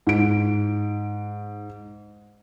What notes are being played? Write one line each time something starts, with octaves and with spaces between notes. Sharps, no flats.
G#2 D7